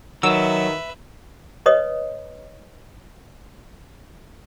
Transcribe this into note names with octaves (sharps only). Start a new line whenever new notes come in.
D#3 F#3 B4 E5 E6
B4 C#5 D#5 D#6